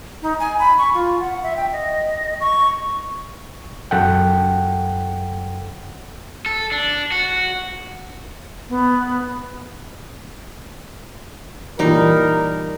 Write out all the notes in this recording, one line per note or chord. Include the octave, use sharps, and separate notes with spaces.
D#4
G#5
B5
C#6
F4
F#5
E5
G5
D#5
C#6
F#2 A4 F#5 G5
A4
D4
F#4
B3
A#2 E3 G3 D#4 A#4